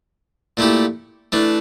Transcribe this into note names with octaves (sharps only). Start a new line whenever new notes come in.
A#2 A3 E4 G4
E3 A3 D4